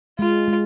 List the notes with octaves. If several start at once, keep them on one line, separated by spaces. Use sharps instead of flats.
G#3 F4
G#3